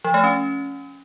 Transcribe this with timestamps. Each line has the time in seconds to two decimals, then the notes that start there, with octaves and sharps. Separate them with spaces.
0.04 F3
0.14 A3
0.24 C#4